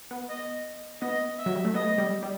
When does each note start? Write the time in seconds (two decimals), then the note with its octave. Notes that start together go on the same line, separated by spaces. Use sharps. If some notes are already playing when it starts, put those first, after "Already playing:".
0.11 B3
0.29 D#5
1.01 B3 D#5
1.39 E5
1.46 F#3
1.55 G3
1.65 A3
1.74 B3 D#5
1.98 G3
2.23 G3